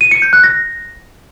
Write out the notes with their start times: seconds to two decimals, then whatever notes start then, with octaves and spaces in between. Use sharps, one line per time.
0.01 D#7
0.11 C#7
0.22 G6
0.33 F#6
0.44 A#6